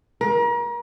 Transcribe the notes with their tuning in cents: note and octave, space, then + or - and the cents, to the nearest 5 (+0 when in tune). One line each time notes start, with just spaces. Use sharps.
A#4 +35